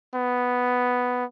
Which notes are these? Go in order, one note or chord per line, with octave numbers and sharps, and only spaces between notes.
B3